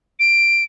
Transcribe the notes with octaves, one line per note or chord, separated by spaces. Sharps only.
D7